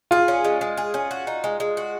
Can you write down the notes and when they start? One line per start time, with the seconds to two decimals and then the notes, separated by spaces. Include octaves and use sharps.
0.11 F4 G#4
0.28 C#4
0.44 G#3
0.61 G#3
0.77 G#4
0.94 C#4
1.11 F#4
1.27 D#4
1.44 G#3
1.60 G#3
1.77 F#4